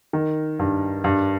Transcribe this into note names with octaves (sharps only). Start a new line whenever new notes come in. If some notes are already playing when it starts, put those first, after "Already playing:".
D#3
G2
G2